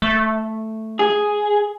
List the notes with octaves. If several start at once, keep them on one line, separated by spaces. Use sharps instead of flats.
A3
G#4